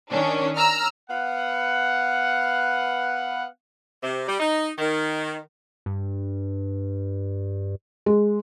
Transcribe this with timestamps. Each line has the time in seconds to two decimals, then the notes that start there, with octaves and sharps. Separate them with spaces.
0.11 D#3 C#4 D4
0.56 A#5 E6 F6
1.09 B3 B4 F5 F#5
4.03 C3
4.28 G3
4.40 D#4
4.78 D#3
5.86 G2
8.06 G#3